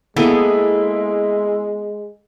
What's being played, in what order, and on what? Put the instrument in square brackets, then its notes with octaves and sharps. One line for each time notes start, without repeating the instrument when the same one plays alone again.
[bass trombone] G#3 [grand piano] A#3 [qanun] B3 G#4 A4 [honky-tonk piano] E4